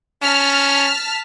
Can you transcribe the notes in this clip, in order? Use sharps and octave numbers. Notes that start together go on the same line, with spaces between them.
C#4 A5 F6 B6